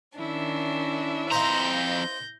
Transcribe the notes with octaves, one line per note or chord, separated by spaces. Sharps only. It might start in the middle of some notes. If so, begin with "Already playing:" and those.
D#3 C#4 D4 E4 E5
F2 C5 D#5 F5 A#5 G6 A#6